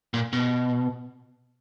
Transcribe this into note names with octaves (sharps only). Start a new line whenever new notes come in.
A#2
B2